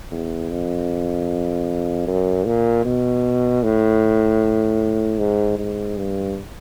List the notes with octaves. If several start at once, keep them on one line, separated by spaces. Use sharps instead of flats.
E2
F2
F#2
A#2
B2
A2
G#2
G#2
G2